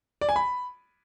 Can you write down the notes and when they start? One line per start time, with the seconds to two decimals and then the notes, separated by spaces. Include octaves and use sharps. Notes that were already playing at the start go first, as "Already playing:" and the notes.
0.21 D5
0.29 G#5
0.36 B5